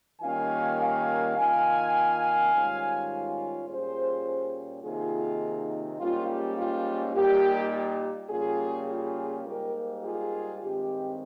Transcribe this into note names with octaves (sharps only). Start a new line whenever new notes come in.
D#3 G3 A#3 C#4 F4 F5 G#5
F5 G#5
D#3 A#3 F4 F5 G#5
G#2 D#3 G3 C#4 F4
A#2 G3 C#4 F4 G#4 C5
C3 D#3 A#3 D#4 F4 G#4
G#2 G3 A#3 C#4 F4
G4
F4
A#2 G3 A#3 D#4 G4
G4
C#3 G3 A#3 C#4 F4 G#4
F4 G#4
G#2 G3 A#3 G4 A#4
F4 G#4
G2 D#3 G#3 C4 G4